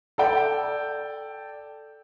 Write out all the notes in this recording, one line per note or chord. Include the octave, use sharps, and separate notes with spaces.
A4 D5 G5 G6